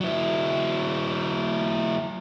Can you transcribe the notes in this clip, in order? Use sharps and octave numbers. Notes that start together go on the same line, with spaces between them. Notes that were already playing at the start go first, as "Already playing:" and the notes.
F#3 E4